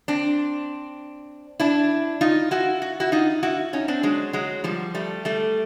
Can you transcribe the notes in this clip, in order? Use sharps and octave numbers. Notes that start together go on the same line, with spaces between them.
C4 D4
D4 E4
D#4 F4
E4 F#4
F#4
E4 F#4
D#4 F4
E4 F#4
C#4 D#4
C4 D4
F#3 G#3
F#3 G#3
F3 G3
G3 A3
G3 A3